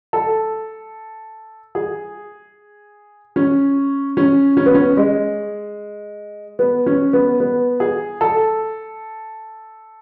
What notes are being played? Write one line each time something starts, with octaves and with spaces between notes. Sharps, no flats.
A4
G#4
C#4
C#4
C#4
B3
C#4
G#3
B3
C#4
B3
B3
G#4
A4